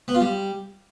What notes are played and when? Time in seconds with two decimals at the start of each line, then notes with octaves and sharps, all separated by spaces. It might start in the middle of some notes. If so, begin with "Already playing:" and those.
0.08 B3
0.14 F4
0.21 G3